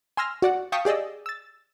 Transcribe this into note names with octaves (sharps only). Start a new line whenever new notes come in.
G#5 C6 E6 F6 A#6
F#4 D5 F#5
F5 G5 A5 C#6 D#6 B6
G4 G#4 D5 D#5 E6
E6 A6